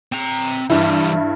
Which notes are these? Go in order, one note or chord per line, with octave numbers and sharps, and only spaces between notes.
C4 A#5
G2 E3 G3 E4